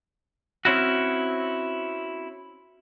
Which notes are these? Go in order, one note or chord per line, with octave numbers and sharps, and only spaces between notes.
C4 C#4 E4 F#4